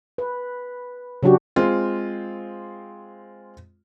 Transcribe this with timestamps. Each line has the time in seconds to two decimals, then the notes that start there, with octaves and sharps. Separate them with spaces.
0.18 B4
1.23 C#3 F#3 D4 F#4 G4
1.56 G#3 C4 F4